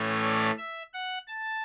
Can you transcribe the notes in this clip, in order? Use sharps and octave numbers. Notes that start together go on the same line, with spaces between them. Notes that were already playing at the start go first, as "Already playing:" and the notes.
Already playing: A2 E3 A3 C#4
D5
E5
F#5
A5